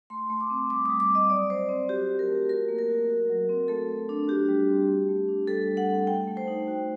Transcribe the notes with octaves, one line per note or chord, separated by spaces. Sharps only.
A3 C6
A3
D6
C4
G3 D6
G3 D#6
D6
C4
D#5
F#3 D5
F#3 C5
C4
F#4 G4
F#3
A#4
A3
F#4 A#4
A#3
A#4
F#4
F#4
F#3
C4
A3 A4
A3
D4
F#4 G4
G3
C4
A3
A3
D4
G3 A4
G3
F#5
C4
A3 G5
A3
C5
D#4
F#4